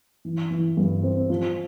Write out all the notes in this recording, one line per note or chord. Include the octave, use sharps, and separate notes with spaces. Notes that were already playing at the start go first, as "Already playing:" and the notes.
E3
E3
G2
C4
F3